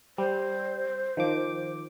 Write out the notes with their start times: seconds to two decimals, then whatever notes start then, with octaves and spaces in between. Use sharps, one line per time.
0.18 G3 C5
1.17 D#3 F3 D6